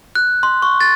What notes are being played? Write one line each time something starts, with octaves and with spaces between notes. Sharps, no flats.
F#6
C6
C#6
A6